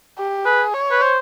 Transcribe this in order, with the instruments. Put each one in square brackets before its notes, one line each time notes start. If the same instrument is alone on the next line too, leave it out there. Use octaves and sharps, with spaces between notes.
[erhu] G4
[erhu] G#4 [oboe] B4
[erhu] C#5
[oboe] B4
C5